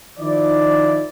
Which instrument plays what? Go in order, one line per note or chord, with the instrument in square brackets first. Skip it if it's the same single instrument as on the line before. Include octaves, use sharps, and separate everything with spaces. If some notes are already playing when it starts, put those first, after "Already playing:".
[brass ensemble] D#3 F3 D#4 E4 D5